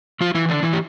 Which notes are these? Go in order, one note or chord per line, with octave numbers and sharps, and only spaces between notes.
F3 F4
E3 E4
D3 D4
E3 E4
G4